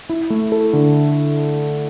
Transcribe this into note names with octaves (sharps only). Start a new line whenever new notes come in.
E4
A3
A4
D3